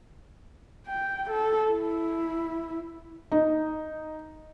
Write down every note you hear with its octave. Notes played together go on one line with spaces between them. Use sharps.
G5
A4
E4
D#4